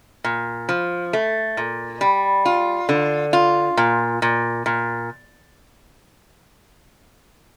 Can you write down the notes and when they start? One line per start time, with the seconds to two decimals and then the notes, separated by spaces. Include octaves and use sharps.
0.24 A#2
0.69 F3
1.13 A3
1.57 A#2
2.01 G3
2.45 F4
2.89 D3
3.33 F4
3.77 A#2
4.22 A#2
4.66 A#2